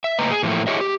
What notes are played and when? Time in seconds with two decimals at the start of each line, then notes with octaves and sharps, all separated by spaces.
0.04 E5
0.19 A2 C#3 A#3 B4 D#5 A#5
0.30 G#4
0.43 A2 E3 F3 A3 A#3
0.67 E4 G4 G#4 C#5 D#5 E5
0.81 G4